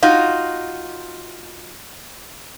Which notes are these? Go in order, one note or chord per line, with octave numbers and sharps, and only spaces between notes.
D#4 F4 F#4